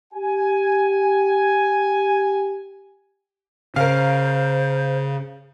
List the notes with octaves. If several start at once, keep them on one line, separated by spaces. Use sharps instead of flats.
G4 G#5
C#3 A#4 C5 F5